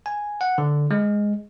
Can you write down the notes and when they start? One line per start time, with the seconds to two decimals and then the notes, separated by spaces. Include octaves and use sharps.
0.06 G#5
0.41 F#5
0.58 D3
0.91 G#3